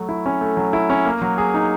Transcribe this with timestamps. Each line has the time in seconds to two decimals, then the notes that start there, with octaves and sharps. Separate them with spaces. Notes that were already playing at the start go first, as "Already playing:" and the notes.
Already playing: F#3 A3
0.09 E4
0.26 C#4
0.41 A3
0.57 F#3
0.73 E4
0.90 C#4
1.05 A#3
1.22 F#3
1.38 G#4
1.54 D#4